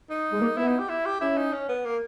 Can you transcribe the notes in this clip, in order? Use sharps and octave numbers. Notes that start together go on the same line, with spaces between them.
D#4
G#3
A#3
B3 E4
D#4
G4
E4
G4
C#4 E4
D#4
C#4
B3
A#3